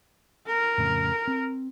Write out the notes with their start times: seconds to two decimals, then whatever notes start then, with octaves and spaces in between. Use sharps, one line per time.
0.46 A#4
0.78 F2 A2 C#3
1.28 C4